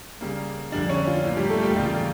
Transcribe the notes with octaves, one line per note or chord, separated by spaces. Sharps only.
C#3 G3 A#3
F2 D3 G3 A#3 D4 D5
C#4 C#5
F4
A2 F3 A#3
G3 G4
A3 A4
G3 G4
E2 C#3 G3 A#3 F4